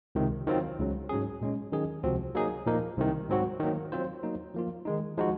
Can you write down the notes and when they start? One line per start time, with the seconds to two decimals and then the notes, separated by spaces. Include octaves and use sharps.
0.15 C#2 C3 D#3
0.47 D#3 F#3 C4 F4
0.79 C#2 C#3 F#3
1.09 G#2 F#3 C#4 G#4
1.41 A#2 G#3 C#4
1.72 D#3 F#3 C#4 G#4 D#5
2.03 C#2 C3 F3 C4 F#4
2.35 F#3 A#3 D#4 G#4
2.66 A#2 F3 A#3 D#4 A#4
2.97 C2 C3 D#3
3.29 G#2 F#3 C4 F#4
3.60 D#3 F#3 A#3
3.92 F#3 C4 F4 C5
4.23 F#3 A#3 D#4
4.54 F3 A#3 F4
4.85 D#3 G#3 D#4
5.17 F3 G#3 D#4 F#4